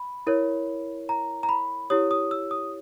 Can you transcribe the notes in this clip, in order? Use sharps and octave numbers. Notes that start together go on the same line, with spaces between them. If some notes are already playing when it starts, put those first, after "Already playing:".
Already playing: B5
E4 A#4 C#5
A#5
A#5
B5
E4 G4 C#5 D#6
D#6
E6
D#6